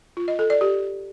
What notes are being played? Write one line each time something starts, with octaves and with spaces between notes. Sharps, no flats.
F4
D#5
A4
D5
G4